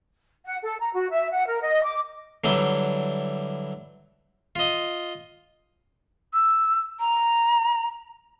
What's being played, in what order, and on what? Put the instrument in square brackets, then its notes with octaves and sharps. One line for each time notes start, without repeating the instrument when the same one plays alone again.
[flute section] F#5
A4
A#5
F#4
E5
F#5
A#4
D#5
D6
[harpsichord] D3 E3 F#3 G3 E4
F4 D#5
[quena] E6
A#5